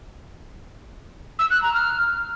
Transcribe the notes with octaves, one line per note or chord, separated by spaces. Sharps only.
E6
F#6
A#5
F6